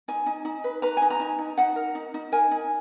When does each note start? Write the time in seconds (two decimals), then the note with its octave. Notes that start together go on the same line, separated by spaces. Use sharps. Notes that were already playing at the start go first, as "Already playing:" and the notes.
0.08 D#4 G#5
0.26 D#4
0.45 D#4
0.64 B4
0.82 B4 A#5
0.97 D#4 G#5
1.10 A#5
1.20 D#4
1.39 D#4
1.58 D#4 F#5
1.76 A#4
1.95 D#4
2.14 D#4
2.32 A#4 G#5
2.51 D#4